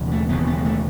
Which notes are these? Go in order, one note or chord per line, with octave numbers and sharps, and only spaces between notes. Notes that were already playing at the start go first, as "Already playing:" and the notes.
Already playing: E1 D#2 C#3
A3
E1 D#2 C#3 B3
B3
G#3
A3